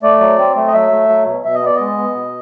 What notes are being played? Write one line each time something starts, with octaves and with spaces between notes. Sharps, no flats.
A3 D5
F#3
C4
A3
D#5
F#3 E5
A3
F#3
B2
B2 E5
D#5
B3 D5
G#3 D#5
B3
B2